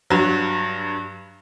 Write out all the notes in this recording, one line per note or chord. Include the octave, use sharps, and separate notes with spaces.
G2 F#3